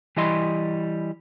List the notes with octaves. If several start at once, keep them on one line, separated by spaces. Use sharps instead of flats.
E3 G3 E4 D#5 C6